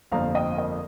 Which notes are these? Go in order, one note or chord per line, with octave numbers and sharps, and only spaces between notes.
G1 F2 F3 A#3 F5 A#5
D#5 G5
F5
A#4 D#5